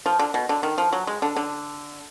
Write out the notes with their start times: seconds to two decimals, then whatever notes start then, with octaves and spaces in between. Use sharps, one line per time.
0.06 F3
0.19 D3
0.34 B2
0.49 D3
0.63 D#3
0.78 F3
0.93 F#3
1.07 G#3
1.22 D3
1.36 D3